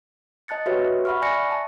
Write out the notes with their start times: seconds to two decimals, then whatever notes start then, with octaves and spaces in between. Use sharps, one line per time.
0.48 D#5 A5 F#6 A6 C#7
0.66 F#4 G4 B4 C#5 E5
1.05 E5 F#5 B5 C#6 F6
1.22 D5 G#5 C#6 F#6 A#6 C#7
1.36 E5
1.51 A5